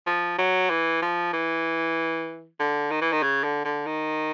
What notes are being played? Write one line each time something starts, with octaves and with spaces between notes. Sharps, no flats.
F3
F#3
E3
F3
E3
D3
D#3
E3
D#3
C#3
D3
D3
D#3